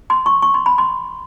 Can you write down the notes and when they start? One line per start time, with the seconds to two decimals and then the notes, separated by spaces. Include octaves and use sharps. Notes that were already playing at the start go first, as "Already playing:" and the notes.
0.10 C6
0.26 C#6
0.42 C#6
0.54 C6
0.66 B5
0.78 C6